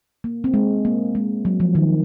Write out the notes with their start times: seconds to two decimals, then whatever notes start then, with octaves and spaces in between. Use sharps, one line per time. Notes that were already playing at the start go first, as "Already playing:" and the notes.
0.24 A#3
0.44 C4
0.54 G#3
0.85 A#3
1.15 G#3
1.45 F#3
1.60 F3
1.75 D#3